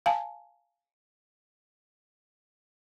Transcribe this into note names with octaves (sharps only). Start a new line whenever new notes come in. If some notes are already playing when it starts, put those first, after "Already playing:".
F5 G#5 A5